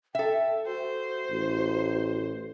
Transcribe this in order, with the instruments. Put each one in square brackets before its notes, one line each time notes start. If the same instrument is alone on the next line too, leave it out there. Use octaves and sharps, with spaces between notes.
[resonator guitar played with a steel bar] A4 E5 [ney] G5
[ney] F#4 [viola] C5
[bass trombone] A1